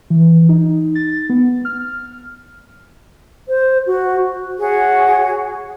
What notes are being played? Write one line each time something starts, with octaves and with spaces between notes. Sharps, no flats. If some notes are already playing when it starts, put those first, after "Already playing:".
E3
D#4
A6
B3
F6
C5
F#4
F#4 G#4 C#5 F#5